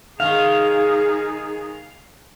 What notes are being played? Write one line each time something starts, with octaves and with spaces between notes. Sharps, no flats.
D#3 G#3 D#4 G#4 F5